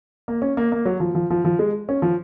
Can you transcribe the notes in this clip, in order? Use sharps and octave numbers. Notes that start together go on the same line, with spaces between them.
A#3
C#4
A#3
A#3
F#3
F3
F3
F3
F3
G#3
C#4
F3